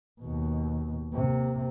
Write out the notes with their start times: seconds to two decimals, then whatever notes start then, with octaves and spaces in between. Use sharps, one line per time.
0.21 D#2 B2
1.14 C3 A#3